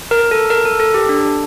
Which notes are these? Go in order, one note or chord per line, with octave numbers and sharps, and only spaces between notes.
A#4
A4
A#4
A4
A4
G4
D4